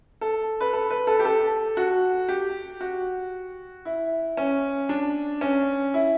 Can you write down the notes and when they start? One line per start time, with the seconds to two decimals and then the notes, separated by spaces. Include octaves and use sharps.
0.21 A4
0.61 B4
0.73 A4
0.90 B4
1.07 A4
1.19 G4
1.25 A4
1.77 F#4
2.28 G4
2.81 F#4
3.85 E4
4.37 C#4
4.89 D4
5.41 C#4
5.94 E4